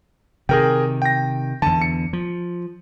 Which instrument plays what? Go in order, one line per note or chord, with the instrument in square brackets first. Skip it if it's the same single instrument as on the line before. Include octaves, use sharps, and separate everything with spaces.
[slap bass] C3 D#3 [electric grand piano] G#4 A#4 G5
[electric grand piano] G5 A#6
[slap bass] E2 D3 [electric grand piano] A5
[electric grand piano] C#7
[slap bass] F3